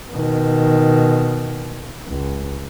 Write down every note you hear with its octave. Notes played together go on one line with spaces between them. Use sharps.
B2 D#3
C#2